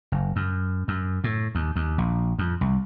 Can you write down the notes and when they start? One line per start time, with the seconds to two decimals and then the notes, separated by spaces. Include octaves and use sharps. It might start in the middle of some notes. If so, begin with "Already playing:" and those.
0.12 F#1
0.36 F#2
0.88 F#2
1.24 A2
1.55 D#2
1.76 D#2
1.98 A#1
2.39 F2
2.61 C2